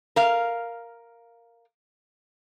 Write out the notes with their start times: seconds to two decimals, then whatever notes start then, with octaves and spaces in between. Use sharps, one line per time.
0.16 A#4 F5